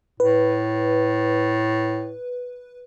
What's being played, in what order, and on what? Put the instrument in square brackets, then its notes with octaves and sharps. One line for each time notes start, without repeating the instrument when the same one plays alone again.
[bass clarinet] A2 [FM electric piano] B4